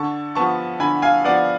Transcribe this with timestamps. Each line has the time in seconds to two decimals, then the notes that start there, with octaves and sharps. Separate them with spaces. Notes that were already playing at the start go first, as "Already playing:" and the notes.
Already playing: D3 A5 C#6
0.35 F3 B3 A5 C#6
0.80 D3 G#5 B5
1.02 F5 G#5
1.25 F3 B3 D5 F#5